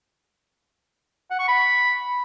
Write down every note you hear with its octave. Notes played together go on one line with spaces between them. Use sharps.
F#5
C#6
B5